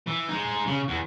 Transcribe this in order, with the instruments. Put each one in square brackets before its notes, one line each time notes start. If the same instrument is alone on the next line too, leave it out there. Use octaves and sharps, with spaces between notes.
[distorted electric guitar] E3
G#3 D#4
C#3
E2